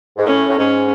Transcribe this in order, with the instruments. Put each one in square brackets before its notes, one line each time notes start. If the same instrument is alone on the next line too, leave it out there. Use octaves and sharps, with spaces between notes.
[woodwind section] G#2
[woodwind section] A2 [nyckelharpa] C#4
[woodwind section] A2
[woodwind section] G#2 [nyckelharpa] C#4